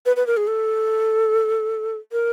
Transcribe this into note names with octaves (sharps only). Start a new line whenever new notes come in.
B4
B4
A#4
G#4
A4
A#4